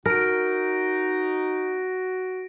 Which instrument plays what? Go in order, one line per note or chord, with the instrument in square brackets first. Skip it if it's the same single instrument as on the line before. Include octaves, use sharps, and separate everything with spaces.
[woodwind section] D#4 [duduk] F#4 [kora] A#4 [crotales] A#6 D7